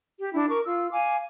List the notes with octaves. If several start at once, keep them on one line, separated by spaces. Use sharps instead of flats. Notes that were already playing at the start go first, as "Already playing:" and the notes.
G4
D4 E4
A#4 C#6 D6
F4 E6
F5 G#5 D6